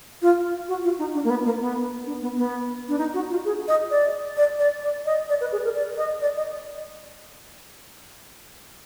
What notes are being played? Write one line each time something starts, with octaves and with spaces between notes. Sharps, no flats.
F4
F#4
F4
D#4
D4
A#3
B3
A#3
B3
D4
B3
B3
D4
D#4
F#4
F4
G#4
D#5
D5
D5
D5
D5
D#5
D5
B4
G#4
A#4
D5
D#5
D5
D#5